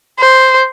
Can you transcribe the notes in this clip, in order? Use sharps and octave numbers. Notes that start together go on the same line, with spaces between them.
C5